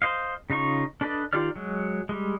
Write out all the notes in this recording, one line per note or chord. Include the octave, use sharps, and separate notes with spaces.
C5 D#5 F5
C#3 D#4 F4 C#6
D4 A4 B4 D5 D#5
D#3 F4 G4 D5 F6
F#3 G#3
G3 G#3